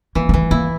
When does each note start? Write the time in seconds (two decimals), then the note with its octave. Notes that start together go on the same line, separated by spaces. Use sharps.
0.15 E3 A#3
0.29 A#3
0.34 E3 A3
0.51 A#3 E4